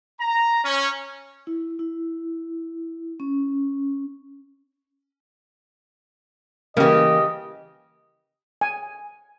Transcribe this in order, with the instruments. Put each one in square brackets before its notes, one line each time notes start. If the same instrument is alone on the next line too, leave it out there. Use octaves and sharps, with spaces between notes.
[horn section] A#5
C#4
[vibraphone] E4
E4
C#4
[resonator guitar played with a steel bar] C#3 G4 [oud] E3 A#3 [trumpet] D#5
[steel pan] G#5